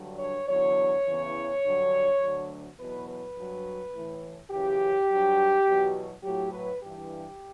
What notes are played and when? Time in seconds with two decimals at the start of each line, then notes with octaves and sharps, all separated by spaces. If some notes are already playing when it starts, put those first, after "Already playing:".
Already playing: G2 D3 F#3
0.19 C#5
0.48 E2 D3 F#3 C#5
1.05 E2 C#3 E3
1.63 G2 D3 F#3
2.20 D2 D3 F#3
2.79 E2 B2 F#3 B4
3.07 B4
3.36 G2 F#3
3.93 A2 E3
4.51 F#2 C#3 E3 G4
5.09 G2 F#3
5.66 E2 B2 F#3
6.23 A2 F#3 G4
6.52 B4
6.81 G2 E3 G4